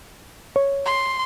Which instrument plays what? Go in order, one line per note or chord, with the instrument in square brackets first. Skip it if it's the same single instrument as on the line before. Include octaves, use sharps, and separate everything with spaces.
[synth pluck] C#5
[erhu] C6